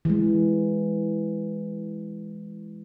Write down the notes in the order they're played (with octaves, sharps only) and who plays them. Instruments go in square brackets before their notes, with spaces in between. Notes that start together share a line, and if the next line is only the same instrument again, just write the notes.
[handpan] E3 G#3